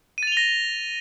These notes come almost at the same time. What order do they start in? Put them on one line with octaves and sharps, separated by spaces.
D#7 A6 F7 G7 A#6